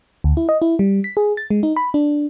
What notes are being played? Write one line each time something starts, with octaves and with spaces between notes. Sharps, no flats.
D2
E4
D#5
E4
G3
B6
G#4
A6
G#3
D#4
B5
D4